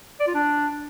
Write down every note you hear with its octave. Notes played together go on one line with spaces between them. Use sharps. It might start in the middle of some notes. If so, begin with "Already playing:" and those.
D5
F4
D4